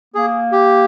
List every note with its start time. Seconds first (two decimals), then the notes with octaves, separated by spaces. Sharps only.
0.14 A#3 G#4
0.52 G4